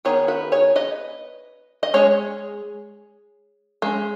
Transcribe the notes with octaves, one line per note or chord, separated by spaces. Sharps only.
D#3 B3 D#4 G#4 C#5
F#4 B4
G#4 C#5
B4 D#5
D#5
G#3 C#4 G#4 C#5
G#3 C#4